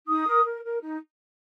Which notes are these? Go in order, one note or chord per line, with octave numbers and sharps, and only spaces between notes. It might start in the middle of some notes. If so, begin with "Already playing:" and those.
D#4 D#6
A#4
A#4
A#4
D#4